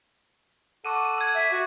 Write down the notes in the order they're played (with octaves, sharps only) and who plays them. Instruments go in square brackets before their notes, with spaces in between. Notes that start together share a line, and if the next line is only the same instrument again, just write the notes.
[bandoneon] A4 F#5 [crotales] C#6 D6 D#7
[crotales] D#7
E6 G#6
[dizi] E5
F#4